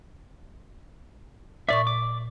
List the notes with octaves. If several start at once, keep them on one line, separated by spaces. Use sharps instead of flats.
A#2 D5 E5 C#6
D6